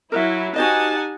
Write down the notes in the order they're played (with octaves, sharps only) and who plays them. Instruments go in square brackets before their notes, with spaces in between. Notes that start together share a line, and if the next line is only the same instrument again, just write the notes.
[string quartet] F#3 [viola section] E4 [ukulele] A#4 E5
[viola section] D#4 G4 G#5 [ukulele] F#4 C5 D#5 [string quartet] F#5 A5